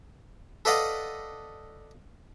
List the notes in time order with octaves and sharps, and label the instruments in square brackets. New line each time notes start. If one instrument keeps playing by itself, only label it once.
[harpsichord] A4 B4 D5 D#5 F5 F#5